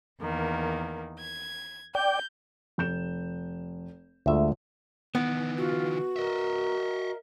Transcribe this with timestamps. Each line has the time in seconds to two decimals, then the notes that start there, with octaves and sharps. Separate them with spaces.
0.21 E2 D#3 A#3
1.18 G#6
1.95 D5 G5 G6
2.78 F1 G6 E7
4.26 D2 G#3 A3 F4 E5
5.15 D#3 E3 B3
5.58 F4 F#4
6.16 A#4 D#5 E5